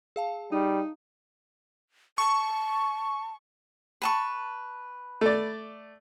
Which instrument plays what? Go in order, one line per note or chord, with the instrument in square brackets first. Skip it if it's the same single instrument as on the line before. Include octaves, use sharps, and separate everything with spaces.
[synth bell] G#4 F5 A5
[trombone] G3 [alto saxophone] D#4
[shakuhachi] A5 [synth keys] C#6
[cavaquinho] B4 A5 C#6
[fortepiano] A3 D5